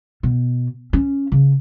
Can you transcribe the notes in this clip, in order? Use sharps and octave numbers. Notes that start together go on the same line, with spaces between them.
B2
C#4
C#3